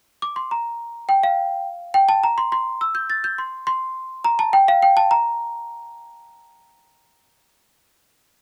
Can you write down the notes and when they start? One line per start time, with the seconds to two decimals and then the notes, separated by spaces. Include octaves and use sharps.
0.22 D6
0.36 C6
0.51 A#5
1.09 G5
1.23 F5
1.94 G5
2.09 A5
2.23 A#5
2.38 C6
2.52 C6
2.81 E6
2.95 G6
3.10 A6
3.24 G6
3.38 C6
3.67 C6
4.24 A#5
4.39 A5
4.53 G5
4.68 F5
4.82 G5
4.97 A5
5.11 A#5